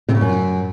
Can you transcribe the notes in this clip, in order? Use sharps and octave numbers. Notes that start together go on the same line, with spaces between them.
C3
C#3
F#2